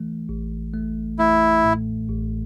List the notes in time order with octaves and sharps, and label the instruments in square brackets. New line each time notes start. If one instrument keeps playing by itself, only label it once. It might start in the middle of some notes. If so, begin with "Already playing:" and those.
Already playing: [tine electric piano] E3 A3
A1
A3
[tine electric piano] A3 [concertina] E4
[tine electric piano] A2
A1